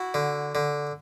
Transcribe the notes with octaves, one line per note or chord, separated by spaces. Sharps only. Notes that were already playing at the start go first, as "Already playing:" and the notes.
Already playing: E4 F#4
D3
D3